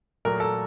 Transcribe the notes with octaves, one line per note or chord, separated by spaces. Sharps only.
A#2 F#3 A3 A#4
A4